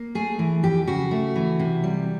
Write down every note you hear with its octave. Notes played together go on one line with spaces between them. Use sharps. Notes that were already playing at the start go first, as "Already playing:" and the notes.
Already playing: A#3
A3 G#4
E3
F2 G4
C#3 F#4
A3
E3
C3
G3